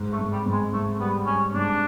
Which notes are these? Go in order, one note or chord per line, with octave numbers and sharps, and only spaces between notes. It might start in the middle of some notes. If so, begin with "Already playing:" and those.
Already playing: G#2
A3
G#2
G3
G#2
G#3
G#2 A3
G3 B3
G3 C#4
G#2 D4